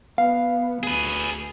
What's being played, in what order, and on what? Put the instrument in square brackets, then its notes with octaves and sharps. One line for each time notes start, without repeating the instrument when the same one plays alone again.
[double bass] B3 [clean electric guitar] F5
[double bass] D2 [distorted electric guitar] G#4 B4